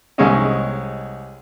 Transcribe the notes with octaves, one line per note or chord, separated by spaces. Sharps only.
C2 G#3 C#4 D#4